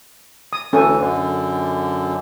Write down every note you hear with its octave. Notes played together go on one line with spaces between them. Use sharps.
D#6
D2 E3 C#4 A4 G#5
F#2 D3